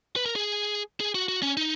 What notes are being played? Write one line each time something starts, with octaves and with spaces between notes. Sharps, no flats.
B4
A#4
G#4
G#4
F#4
F#4
C#4
D#4